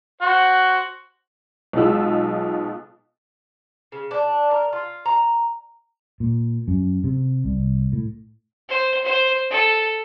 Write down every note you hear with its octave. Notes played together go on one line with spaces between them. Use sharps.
F#4 C5 F#5
B1 B2 G#3 F4 E6
C#3
D4
A#4
F4
A#5
A#2
F#2
C3
C2
A2
C5
C5
A4